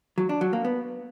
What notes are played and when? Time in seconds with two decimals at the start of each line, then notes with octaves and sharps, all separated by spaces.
0.18 F#3
0.29 D4
0.41 F#3
0.53 A#3
0.65 B3